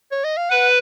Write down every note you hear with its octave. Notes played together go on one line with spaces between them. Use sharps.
C#5
D#5
F5
B4 F#5